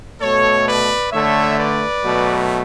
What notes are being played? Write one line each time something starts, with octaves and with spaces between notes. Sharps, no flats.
B2 A3 A4 C#5
B4 D5
D3 A3 C#5 E5
B4 D5
B2 F#3 A3